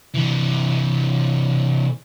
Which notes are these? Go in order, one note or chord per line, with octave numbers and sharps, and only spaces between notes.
C3 E3